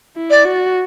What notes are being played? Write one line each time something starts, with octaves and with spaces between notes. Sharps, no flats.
E4
D5
F#4